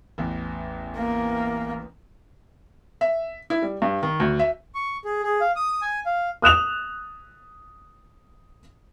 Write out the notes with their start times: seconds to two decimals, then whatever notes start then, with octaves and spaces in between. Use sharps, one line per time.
0.18 A1 E2
0.97 A#3
3.01 E5
3.50 E4
3.62 G3
3.82 G2
4.03 D#3
4.20 D2
4.39 E5
4.75 C#6
5.05 G#4
5.24 G#4
5.41 F5
5.56 D#6
5.82 G#5
6.06 F5
6.42 D#6 F#6 E7 F7